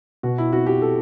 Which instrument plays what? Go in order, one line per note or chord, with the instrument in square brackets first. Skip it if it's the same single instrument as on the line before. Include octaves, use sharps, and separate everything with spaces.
[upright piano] B2 F#4
E4
C4 F#4
G4
A4